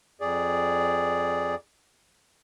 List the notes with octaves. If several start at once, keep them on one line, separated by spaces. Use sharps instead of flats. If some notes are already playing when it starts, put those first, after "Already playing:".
F2 G#4 D5